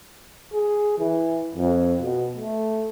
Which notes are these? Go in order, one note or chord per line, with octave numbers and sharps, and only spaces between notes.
G#4
E3
F2
B2
A3